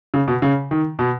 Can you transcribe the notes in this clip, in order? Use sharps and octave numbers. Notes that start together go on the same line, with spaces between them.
C#3
B2
C#3
D#3
B2